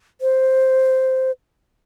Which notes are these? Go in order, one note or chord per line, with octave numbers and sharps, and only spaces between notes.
C5